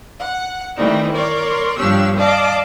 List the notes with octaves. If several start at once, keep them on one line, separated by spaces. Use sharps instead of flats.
F#5
D#3 E3 G3 A3 C4 D#4
A#4 C#5 D5 C6
G2 F3 D4 G4 C#5 E6
D5 D#5 F5 A5 D6